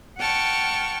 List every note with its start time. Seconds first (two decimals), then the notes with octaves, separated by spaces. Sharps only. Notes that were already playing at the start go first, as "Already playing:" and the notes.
0.19 F#5 G5 A5 C#6 F6